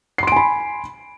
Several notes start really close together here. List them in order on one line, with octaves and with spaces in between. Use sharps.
C7 C6 D7 G#5 B5